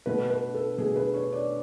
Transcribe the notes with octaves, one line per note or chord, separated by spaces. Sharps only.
B2 A3 B4
B4
A4
B2 A3 G#4
B4
C#5
D5